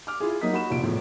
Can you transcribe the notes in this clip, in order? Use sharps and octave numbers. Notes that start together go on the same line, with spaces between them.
D6 F6
E4 F4 G#4
F#3 A#3 D#4 D#6 B6
F#4 B5 E7
F1 A#2 D7
E2 A2 F3